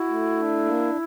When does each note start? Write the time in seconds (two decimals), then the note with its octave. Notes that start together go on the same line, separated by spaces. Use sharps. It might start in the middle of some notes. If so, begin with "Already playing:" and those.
Already playing: E4 F#4
0.09 A3
0.37 D4
0.66 A#3